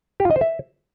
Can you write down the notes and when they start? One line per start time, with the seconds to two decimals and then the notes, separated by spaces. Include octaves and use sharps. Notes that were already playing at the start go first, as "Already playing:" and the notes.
0.20 G4
0.25 F4
0.31 D#5
0.36 C5
0.41 E5